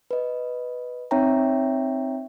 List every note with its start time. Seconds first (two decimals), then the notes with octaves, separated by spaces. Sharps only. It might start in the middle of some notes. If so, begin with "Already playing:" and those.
0.11 B4 D#5
1.11 C4 D#4 C#5 E5 G5 A#5